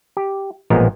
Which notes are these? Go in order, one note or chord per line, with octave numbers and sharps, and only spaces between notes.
G4
A1 A#2 F3 G#3 B3 A#5